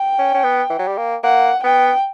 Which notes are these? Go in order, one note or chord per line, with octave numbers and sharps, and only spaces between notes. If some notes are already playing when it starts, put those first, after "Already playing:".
Already playing: G5
C#4
C#4
B3
E3
F#3
G3
A#3
A#3 F#5
B3 G5